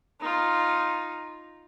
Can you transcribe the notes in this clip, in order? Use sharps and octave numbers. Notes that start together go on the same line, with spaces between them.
D#4 F4